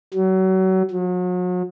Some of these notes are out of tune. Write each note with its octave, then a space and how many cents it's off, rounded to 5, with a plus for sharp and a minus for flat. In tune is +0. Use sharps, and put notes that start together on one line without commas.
F#3 +30
F#3 -40